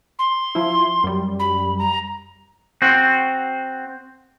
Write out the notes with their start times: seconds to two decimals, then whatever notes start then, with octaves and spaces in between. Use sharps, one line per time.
0.19 C6
0.55 F3 E4
1.04 F#2 G3
1.39 B5
1.78 A#5
2.82 C4 F#4